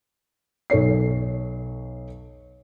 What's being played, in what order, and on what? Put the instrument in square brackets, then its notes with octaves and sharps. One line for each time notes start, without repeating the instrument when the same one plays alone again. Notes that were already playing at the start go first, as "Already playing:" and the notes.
[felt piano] B1 A4 C#5 C7